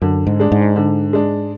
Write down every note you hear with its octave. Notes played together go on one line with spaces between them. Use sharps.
F#2 D3
G#2
G#3 D4
G#2
D3
G#3 D4